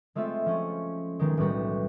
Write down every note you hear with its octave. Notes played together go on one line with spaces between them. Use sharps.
G#3 A3 C4 F4 E5
F3 C#4
B1 D#3 G#3
B1 A2 G3 F#4 B4